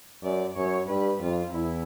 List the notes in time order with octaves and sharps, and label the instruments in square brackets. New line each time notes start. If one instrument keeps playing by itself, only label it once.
[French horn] F#2 [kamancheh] D5
[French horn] F#2 [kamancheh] C#5
[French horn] G2 [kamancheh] B4
[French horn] F2 [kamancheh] F4
[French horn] E2 [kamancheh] E4